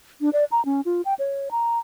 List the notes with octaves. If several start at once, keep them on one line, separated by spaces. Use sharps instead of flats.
D4
D5
A#5
C#4
F4
G5
C#5
A#5